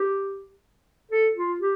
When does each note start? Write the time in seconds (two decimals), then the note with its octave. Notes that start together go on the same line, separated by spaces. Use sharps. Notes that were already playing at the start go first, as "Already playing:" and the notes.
Already playing: G4
1.11 A4
1.36 F4
1.60 G4